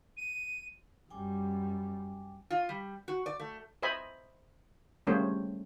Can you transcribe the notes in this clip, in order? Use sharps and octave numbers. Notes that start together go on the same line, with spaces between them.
D#7
F#2 G3 G5 G#5 D6
F4
G3
F#4
D5
A3
C5 D#5 E5 G#5 B5
G3 A3 A#3 C#4 G#4 C5